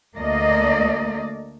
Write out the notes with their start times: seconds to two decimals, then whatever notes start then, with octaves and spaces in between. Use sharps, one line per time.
0.16 D2 A3 A#3 D5 D#5